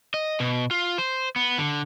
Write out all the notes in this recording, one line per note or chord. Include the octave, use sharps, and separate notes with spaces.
D#5
B2
F4
C5
B3
D3